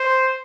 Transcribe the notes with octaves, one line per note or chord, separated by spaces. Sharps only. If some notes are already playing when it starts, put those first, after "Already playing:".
Already playing: C5